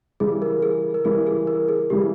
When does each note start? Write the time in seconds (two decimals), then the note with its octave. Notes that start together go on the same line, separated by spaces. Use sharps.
0.20 C#3 E3 G3 G#4
0.42 A#4
0.62 G#4
0.94 A#4
1.05 C#3 E3 G3 G#4
1.27 G#4
1.47 A#4
1.69 G#4
1.90 C#3 E3 G3 G4